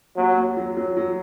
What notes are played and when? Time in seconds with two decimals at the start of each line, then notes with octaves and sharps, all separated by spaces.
0.16 D#2 F#3
0.37 D#2
0.57 F#3
0.77 F#3
0.97 F#3